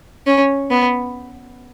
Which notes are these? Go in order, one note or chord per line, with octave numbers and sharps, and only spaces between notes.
C#4
B3